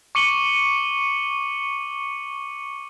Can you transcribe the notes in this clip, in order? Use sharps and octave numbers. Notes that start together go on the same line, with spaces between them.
C#6 D6 C#7 D#7 F#7 G7